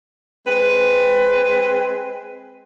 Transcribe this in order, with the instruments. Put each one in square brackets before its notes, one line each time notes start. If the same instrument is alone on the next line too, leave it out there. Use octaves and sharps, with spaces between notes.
[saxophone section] G#3 C4 B4